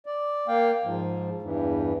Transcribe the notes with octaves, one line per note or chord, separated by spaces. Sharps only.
D5
A#3 F5 G5
G#2 F3
E2 G2 E3